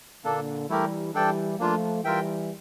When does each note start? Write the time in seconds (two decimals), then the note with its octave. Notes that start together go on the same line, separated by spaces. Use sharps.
0.24 A#2 D3 A#3 D4 A4
0.69 E3 G3 A3 E4 G4 A#4
1.14 E3 G3 D4 A4 D5 G5
1.59 F3 A3 A#3 D4 F4
2.04 E3 G3 F4 A#4 E5 G5